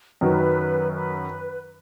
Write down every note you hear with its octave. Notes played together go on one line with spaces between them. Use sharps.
F#2 D#3 F#3 B4
B4